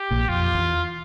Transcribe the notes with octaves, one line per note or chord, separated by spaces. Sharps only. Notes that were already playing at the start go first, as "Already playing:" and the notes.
Already playing: G4
A#1 A#2
F2 F4
E2